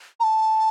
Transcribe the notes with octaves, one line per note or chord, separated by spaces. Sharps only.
A#5
A5